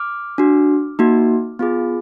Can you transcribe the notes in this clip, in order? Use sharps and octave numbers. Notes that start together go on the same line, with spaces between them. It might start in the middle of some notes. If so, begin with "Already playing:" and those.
Already playing: D6 F6
D4 F#4
A#3 D#4 F#4
B3 F4 G#4